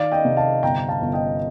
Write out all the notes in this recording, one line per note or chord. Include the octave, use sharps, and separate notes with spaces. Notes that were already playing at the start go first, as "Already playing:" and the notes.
Already playing: D#3 D5 F5
D#5 G5
C3
F5 A5
G1 G5 A#5
F5 A5
G1
D#5 G5